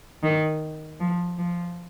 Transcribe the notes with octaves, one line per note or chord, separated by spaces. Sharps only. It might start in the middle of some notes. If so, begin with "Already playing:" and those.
D#3
F3
F3